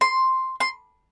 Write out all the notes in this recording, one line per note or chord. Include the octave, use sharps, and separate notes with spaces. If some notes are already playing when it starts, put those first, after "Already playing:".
C6
C6